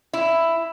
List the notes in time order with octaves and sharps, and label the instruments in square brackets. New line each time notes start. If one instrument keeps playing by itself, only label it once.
[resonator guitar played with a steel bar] E4